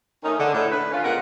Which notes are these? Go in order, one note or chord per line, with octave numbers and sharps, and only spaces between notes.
D#3 A3 C#4 D#4
D3
A2
D3 B4
C#4 F4
A#2 G#3 B3 A#4 F#5